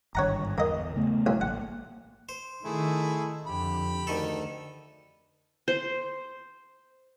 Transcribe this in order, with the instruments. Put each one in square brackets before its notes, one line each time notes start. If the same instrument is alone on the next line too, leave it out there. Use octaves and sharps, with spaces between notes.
[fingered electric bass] G#1 G2 D3 [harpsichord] C#5 F#5 A#5
[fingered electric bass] E2 [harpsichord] A#3 D#5
[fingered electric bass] C#3 A3 B3
[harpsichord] B1 F4
[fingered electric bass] A1 A#3 [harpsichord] F#5
[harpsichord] C5
[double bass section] D#3 [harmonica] A3 E4 G#4
[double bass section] F2 D3 [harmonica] G4 B5
[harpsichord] D2 D#3 A4
[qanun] C5